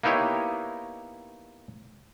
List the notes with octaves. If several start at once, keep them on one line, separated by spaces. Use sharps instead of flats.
A#3 B3 D#4 E4 G4 C#5